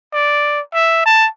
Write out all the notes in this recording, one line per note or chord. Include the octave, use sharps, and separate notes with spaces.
D5
E5
A5